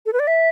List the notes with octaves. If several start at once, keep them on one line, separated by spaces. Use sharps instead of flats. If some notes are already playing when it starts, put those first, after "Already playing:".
A4
B4
D5
E5